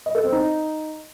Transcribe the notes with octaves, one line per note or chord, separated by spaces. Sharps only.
D#5
A4
C4
D#4